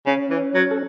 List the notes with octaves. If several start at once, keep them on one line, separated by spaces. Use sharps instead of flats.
C#3 C#4
E3
F#3
A4